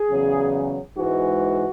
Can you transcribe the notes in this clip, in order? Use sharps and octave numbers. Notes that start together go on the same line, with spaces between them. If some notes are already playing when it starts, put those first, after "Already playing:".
Already playing: G#4
E2 C#3 F#3
G#2 E3 G#3 F#4